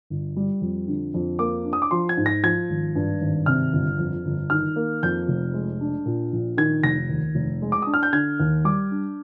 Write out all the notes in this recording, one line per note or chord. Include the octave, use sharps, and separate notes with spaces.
G1
G3
F2
D3
F2
A#3 D6
D4
D#6
D6
F3 C6
G#6
G#2
A#6
F3 G#6
G#1
G2
G#1
C3 F6
G1
F2
G1
D#3 F6
A#3
F2 G6
F1
G#3
D4
A#2
A#1
D#3 G#6
F1 A#6
D#2
F1
G#3
D6
D4 D#6
F6
G6
D3 G#6
D#2
G3 D6
D4